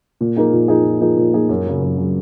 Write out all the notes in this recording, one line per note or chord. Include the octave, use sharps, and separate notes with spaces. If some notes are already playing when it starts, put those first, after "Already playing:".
A#2
F3 A#3 D#4 G#4
A#2
F3 A#3 D#4 G#4
A#2
F3 A#3 D#4 G#4
A#2
F3 A#3 D#4 G#4
F#2
C#3 F#3
F#2
C#3 F#3